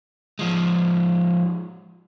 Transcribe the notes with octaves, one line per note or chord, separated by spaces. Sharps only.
F3 G#3